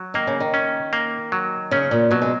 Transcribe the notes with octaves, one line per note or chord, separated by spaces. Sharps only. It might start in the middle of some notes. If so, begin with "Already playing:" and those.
Already playing: F#3
D#3 A#3
C#3
D#3
C#4
A#3
F#3
C#3 C#4
A#2
B2 F#3
G#3